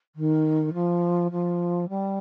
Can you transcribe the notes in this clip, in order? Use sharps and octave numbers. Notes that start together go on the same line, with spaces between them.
D#3
F3
F3
G3